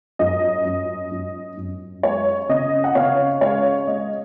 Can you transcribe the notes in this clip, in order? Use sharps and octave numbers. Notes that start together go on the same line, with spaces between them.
F#2 D#5
F#2
F#2
F#2
G#3 C#5
C#3 D#5
F#5
C#3 C#5 F5
G#3 C#5 F5
G#3 D#5